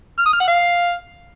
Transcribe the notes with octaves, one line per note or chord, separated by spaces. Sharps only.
F6
D#6
F6
F#5
F5